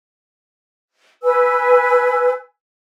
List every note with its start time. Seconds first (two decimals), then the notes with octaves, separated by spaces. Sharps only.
1.23 B4 G#5 E6